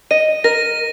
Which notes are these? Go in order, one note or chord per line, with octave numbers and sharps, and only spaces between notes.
D#5 D#7
A#4 A#6